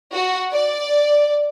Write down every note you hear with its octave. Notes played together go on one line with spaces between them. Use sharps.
F#4
D5